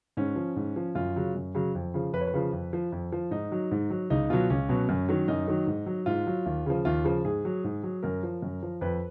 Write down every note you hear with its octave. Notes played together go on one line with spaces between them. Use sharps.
G#2 C#4
F3
G#2
F3
F#2 F4
C#3 F#3
F#2
C#3 F#3
F2
C#3 F3
F2 B4
C#5
B4
C#3 F3
F2
F3
F2
F3
G#2 D#4
F#3
G#2
F#3
C#2 D#4
B2 F#3 F4
C#2 C#4
B2 F#3
F#2
D#3 F#3
F#2 D#4
D#3 F#3
G#2
F#3
G#2 F4
F#3
D#2
C#3 F3
D#2 F4
C#3 F3
G#2 G#4
F#3
G#2
F#3
F#2 A#4
F3
F#2
F3
F2 B4